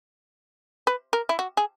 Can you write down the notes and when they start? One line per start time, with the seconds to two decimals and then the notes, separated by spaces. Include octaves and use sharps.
0.87 B4
1.13 A#4
1.29 E4
1.39 F#4
1.57 G#4